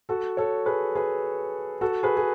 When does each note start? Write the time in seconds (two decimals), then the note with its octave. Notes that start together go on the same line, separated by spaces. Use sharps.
0.09 F#4 A4
0.37 A4 C#5
0.66 G#4 B4
0.95 G#4 B4
1.81 F#4 A4
2.03 G#4 B4
2.17 G#4